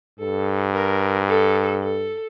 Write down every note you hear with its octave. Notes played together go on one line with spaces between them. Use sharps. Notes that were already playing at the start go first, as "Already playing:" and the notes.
G2 A4
A#4
A4
A4